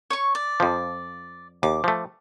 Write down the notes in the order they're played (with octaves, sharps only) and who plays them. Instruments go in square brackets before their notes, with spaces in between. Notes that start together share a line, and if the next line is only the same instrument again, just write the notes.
[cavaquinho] C#5 C#6
D5
[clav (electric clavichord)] F2 F3
[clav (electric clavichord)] D#2 [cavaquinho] D6
[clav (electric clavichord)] F3 A3